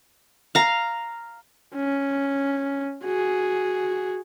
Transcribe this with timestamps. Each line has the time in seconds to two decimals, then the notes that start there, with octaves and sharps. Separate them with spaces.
0.55 F5 A#5
1.75 C#4
3.04 F#4 G#4